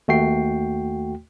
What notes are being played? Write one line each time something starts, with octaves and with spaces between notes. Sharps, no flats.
D#2 A3 F#4 G5 C7